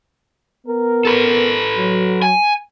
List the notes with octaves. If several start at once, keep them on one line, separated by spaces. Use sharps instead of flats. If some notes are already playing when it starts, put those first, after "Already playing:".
B3 A#4
A4 B4
F#3
G#5